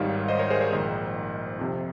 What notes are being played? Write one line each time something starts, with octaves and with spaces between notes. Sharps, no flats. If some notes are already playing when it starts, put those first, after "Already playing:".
Already playing: G#1 G#2 D#3 G3 C#5 F5
C5 D#5
A#4 C#5
G#4 C5
A#4 C#5
A#1 G#2 D#3
F2 C3 F3